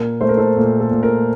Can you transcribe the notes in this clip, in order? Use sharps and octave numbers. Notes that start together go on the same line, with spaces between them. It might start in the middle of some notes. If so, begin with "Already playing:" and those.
Already playing: A#2 A#4
A3 C5
A#4
A4 C5
A#2
A4
A#2
A#4